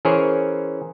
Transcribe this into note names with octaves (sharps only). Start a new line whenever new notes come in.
E3 C#4 G#4 A#4 C5 C#5